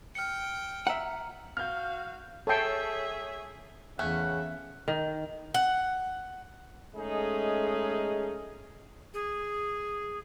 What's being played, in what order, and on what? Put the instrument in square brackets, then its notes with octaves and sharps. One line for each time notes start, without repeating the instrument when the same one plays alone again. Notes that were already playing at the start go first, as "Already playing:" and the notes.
[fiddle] G5 [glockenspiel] F6 C#7
[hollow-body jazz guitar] E5 F#5 [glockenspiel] A#5
[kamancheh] F#4 F5 [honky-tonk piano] F6 G6
[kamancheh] G#4 E5 [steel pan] A4 G5 A5 [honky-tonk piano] C#5 C7
[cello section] E2 E5 [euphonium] C#3 [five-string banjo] A3 C#4 [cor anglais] F#5
[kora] D#3
[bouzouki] F#5
[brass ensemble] G#3 A3 C#4 D#4 G#4
[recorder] G#4